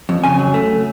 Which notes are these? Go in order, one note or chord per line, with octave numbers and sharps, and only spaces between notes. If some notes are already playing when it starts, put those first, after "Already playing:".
F2
C#3 G#5
F#3
A3